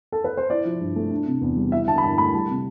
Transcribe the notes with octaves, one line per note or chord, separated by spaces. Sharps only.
A4
B4
C5
E4 D5
F3
G2
A3
D4
C3
E2
G3
E4 E5
D3 A5
B5
G2 A5
A3 B5
G3 A5
C3